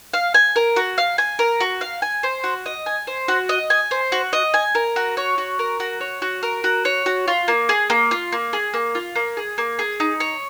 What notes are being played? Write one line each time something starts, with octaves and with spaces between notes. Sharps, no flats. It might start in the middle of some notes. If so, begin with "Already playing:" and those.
F5
G#5
A#4
F#4
F5
G#5
A#4
F#4
F5
G#5
C5
F#4
D#5
G#5
C5
F#4
D#5
G#5
C5
F#4
D#5
G#5
A#4
F#4
C#5
F#4
A#4
F#4
C#5
F#4
A#4
F#4
C#5
F#4
F4
A#3
G#4
A#3
F4
A#3
G#4
A#3
F4
A#3
G#4
A#3
G#4
D#4
C#5